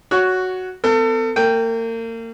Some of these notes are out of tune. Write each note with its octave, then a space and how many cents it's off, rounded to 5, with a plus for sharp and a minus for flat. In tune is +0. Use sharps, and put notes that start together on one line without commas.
F#4 +0 C#5 +15
B3 +45 A4 +35
A#3 -35 G5 +0